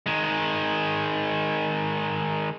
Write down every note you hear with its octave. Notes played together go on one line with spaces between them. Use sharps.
D#3 G#3